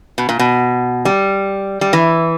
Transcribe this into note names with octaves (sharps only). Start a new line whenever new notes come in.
B2
A#2
B2
G3
G3
E3